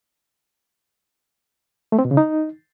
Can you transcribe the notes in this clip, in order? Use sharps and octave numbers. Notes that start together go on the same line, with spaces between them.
A3
C4
B2
C#3
D#4